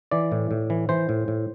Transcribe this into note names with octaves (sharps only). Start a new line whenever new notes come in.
E3 D5
A2
A2
E3
E3 C5
A2
A2